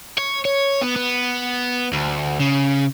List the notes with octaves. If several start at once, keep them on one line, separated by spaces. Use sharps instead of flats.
C#5
C#5
B3
B3
D2
C#3